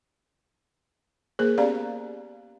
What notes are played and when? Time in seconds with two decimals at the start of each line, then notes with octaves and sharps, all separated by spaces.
1.39 A#3 G#4 A#4 C5
1.58 B3 C#4 G4 D5 F5 A#5